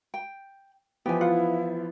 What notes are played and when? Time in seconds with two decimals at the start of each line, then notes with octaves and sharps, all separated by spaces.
0.14 G5
1.06 E3 F3 B3 E4 G4 G#5
1.21 F4 F#5